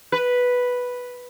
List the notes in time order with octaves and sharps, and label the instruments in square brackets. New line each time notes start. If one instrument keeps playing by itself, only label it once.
[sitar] B4